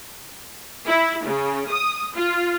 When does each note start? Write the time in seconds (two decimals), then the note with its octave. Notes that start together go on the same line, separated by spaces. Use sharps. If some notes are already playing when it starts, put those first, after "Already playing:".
0.85 E4
1.25 C#3
1.69 D#6
2.15 F4